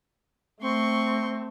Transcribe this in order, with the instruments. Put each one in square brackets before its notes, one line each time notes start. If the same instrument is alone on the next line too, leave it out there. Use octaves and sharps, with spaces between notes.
[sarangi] A3 [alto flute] C4 [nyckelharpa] C6 C#6